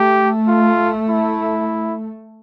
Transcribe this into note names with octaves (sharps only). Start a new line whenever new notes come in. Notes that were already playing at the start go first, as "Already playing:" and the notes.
Already playing: A3 G4
F4
E4